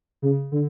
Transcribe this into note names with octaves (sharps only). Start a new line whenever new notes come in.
C#3
D3